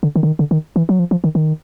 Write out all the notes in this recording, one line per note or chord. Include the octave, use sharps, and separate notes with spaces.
D3
D#3
D3
D#3
D3
D#3
E3
F#3
F3
F3
D#3
D#3